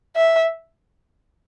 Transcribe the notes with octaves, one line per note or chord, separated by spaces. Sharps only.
E5